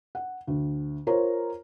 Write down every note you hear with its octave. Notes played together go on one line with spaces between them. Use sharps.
F#5
D2
F4 A#4 C5 C#5 A#5